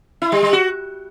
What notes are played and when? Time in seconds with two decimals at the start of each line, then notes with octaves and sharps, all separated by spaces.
0.22 E4
0.32 G3
0.42 G3
0.53 F#4